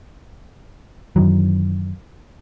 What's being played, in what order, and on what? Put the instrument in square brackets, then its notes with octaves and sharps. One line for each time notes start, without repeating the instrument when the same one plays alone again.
[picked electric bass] F#2 D#3 E3 F#3